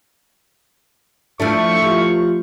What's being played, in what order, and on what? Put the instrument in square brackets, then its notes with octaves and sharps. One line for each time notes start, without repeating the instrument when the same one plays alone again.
[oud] F3 A3 D4 [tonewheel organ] E4 A4 E5 [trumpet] C#6
[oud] F3 [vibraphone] F4 G4 F5